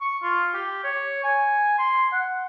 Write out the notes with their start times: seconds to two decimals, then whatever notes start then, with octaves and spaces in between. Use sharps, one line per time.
0.01 C#6
0.23 F4
0.54 G4
0.84 C#5
1.24 G#5
1.79 C6
2.12 F#5